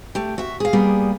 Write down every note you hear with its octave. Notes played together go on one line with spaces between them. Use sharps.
A3 G4
F#4 E5
G#4 F5
G3 A#3 B3 G#4